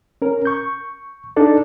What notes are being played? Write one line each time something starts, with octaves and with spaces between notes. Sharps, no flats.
C#4 A#4
C#6 G6
D4 D#4 A4 D5